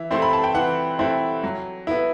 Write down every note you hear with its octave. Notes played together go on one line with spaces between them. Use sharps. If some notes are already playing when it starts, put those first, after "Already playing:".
Already playing: E3 E5
A3 C4 E4 C6
B5
A5
G5
E3 F#5
A3 C4 E4
F#3
B3 E4